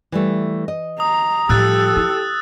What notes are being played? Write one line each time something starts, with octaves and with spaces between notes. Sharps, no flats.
E3 G3 A3
D#5
A#5 D#6
A2 F3 G3 G4 A4 E6 F#6 A6
E4